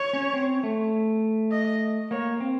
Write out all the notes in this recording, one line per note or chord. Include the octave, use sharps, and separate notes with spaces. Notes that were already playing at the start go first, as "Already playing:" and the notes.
Already playing: C#5
C#4
C4
A3
D#5
A#3 C#5
C4